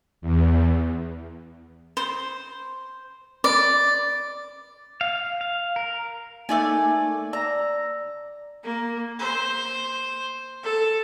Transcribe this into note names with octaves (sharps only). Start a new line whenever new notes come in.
E2
C5
D5
F5
F5
A#4
A3 A#3 D#4 D5 G#5
D5 A#5 E6
A#3
C5
A4